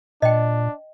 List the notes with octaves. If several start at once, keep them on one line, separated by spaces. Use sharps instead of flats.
A#2 D4 D#5 G5